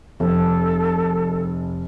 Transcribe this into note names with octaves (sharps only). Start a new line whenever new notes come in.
F1 A4